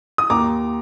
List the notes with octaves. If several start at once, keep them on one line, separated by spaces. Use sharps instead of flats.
D#6
D#2 A#5 D6